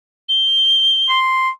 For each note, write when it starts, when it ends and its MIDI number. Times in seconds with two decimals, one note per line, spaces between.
0.29 1.18 103
1.09 1.49 84